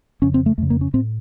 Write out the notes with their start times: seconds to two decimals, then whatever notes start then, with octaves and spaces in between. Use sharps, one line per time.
0.22 F2 C#3 C#4
0.34 C4
0.46 A3
0.58 F2 C#3 A3
0.70 A#3
0.81 C#4
0.94 A2 C4